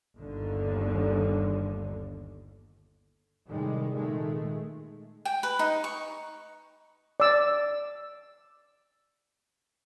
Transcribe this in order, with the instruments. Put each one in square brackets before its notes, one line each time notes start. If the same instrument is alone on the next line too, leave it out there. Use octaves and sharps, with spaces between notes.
[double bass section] G1 D#2 D3
A2 C3 D#3 G3 G#3
A#2 D#3 G#3 A3
[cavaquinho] G5
B4
D#4
C#6
[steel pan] D5 E6